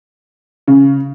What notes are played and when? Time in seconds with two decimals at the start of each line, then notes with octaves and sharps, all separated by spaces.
0.68 C#3